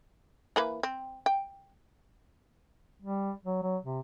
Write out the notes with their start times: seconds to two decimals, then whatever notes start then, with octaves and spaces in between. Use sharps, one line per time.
0.56 E3 A#3 B4
0.83 C4
1.26 G5
3.02 G3
3.46 F#3
3.63 F#3
3.84 C3